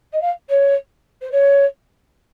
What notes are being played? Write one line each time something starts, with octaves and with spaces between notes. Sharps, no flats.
D#5
F5
C#5
C5
C#5